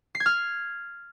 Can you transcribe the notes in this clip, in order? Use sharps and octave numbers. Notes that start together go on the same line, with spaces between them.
C7
G#6
F6